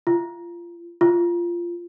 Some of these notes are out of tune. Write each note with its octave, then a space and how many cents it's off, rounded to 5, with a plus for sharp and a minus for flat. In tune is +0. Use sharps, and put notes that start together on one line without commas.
F4 -25
F4 -15